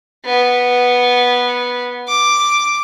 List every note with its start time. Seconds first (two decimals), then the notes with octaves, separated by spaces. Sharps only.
0.25 B3
2.08 D6